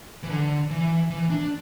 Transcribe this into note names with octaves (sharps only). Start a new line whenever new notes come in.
E3
D3
E3
E3
D4